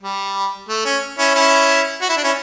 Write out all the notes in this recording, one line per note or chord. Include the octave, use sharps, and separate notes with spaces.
G3
A3
C#4
C#4 E4
C#4 E4
F#4
E4
D4
C#4 E4